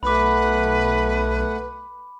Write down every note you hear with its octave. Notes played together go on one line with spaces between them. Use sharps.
B1 A3 B4 F#5 B5 D6